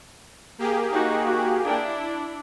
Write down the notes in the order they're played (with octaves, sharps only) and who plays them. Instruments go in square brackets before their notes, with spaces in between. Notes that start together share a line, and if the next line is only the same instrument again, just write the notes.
[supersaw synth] A#3 G4 G#4
[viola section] D#4 F#4
F#4
D4 E4